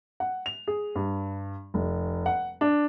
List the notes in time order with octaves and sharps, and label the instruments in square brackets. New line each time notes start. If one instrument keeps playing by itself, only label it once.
[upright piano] F#5
F7
G#4
G2
F1
F#5
D4